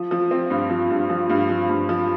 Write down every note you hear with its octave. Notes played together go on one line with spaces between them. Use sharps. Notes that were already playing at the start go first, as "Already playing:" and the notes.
Already playing: F3
F3
C4
G2
F3
G2
F3
G2
F3
G2
F3